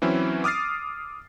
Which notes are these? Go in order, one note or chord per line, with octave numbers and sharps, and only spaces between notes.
E3 F#3 C4 C#4 E4
D6 D#6 F6 A6 C7